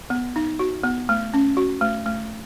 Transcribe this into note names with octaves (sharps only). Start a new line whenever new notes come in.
B3
D#4
F#4
B3
A3
C#4
F#4
A3
A3